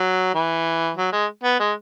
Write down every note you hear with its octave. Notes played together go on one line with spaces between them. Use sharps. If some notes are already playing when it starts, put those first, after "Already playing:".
Already playing: F#3
E3
F#3
G#3
B3
G#3